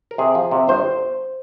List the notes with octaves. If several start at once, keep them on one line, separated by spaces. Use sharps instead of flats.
A#4
C3 G#4
F3
C3
G1 C5